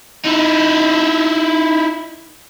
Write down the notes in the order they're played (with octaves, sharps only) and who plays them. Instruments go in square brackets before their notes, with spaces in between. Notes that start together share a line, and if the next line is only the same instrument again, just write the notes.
[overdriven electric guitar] D#4 E4